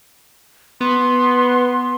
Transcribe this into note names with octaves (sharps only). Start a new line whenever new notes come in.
B3 C6